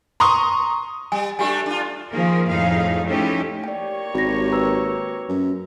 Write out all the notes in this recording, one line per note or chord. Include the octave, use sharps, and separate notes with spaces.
A#5 C6 C#6 D#6
G3 G#5
G3 A3 D4 G4 G#5
D4 F4
D#3 F3 A#3 G#4 A#4
F2 A2 D#4 G#4 F5
F3 A3 C#4 D#4 E4 G4
A#3 G4 C#5 D5 G5
G#1 F#4 A#6
B4 A#5 E6
F#2